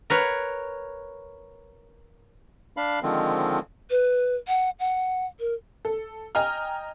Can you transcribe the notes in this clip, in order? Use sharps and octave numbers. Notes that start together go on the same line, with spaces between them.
A#4 B4 C#5
D4 F5 B5
D3 D#3 F3 G#3 C4
B4
F#5
F#5
A#4
A4
D#5 G5 G#5 A#5 F6